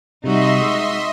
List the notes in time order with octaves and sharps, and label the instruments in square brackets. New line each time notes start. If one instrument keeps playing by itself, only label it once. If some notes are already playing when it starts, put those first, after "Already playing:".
[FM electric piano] C3 G3 [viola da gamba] D#4 F#4 [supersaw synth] D#5 E5 C6
[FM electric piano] G#3